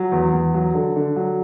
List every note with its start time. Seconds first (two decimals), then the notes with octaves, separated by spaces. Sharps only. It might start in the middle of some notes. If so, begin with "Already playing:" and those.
Already playing: F#3
0.12 E2
0.33 E2
0.54 F#3
0.75 D3
0.96 D3
1.16 F#3